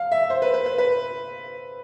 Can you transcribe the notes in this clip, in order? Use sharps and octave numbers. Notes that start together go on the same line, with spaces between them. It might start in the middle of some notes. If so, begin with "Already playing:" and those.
Already playing: F5
E5
C5
B4
B4
B4
B4